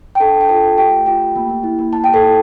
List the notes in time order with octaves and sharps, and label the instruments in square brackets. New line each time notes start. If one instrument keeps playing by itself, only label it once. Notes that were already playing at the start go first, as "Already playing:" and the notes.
[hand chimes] G5
D4 A4 A5
D4
G5
F4 A4 A5
F4
A3 G4 G5
A3
F4 G4 G5
A3
A#3
A#3
E4
A#3
A#3 A5
G4 G5
A4 A5
E4